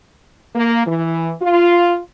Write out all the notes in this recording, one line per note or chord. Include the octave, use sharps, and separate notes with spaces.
A#3
E3
F4